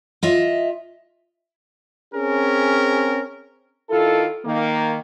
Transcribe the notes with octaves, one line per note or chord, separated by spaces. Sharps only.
F4 D#5 E5
C4 C#4 G#4 A#4
D#3 E4 F4 A4
D#3 A#3